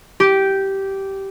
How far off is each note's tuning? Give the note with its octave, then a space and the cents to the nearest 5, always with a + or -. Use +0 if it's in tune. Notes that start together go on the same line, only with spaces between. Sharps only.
G4 -10